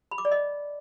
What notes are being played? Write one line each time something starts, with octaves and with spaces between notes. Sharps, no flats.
B5
D6
D5
D#5